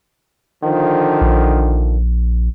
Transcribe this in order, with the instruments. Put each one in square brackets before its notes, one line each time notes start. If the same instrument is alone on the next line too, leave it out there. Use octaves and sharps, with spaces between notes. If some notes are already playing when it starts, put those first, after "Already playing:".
[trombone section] D3 D#3 F3
[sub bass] A#1